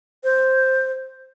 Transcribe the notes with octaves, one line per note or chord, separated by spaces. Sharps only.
C5